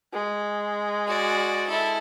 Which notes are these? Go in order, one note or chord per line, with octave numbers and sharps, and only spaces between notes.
G#3
F#4 D5
E4 A4